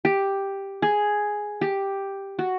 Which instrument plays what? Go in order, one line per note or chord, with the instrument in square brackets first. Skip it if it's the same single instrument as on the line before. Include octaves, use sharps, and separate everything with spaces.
[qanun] G4
G#4
G4
F#4